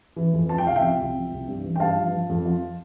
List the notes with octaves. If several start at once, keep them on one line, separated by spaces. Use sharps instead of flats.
E3
F2
F3 A5
G5
C2 F5
E5 G5
F3
C2
F3
C2
G2
E3
G5
G2 F5 A5
F3
F3
F2
F3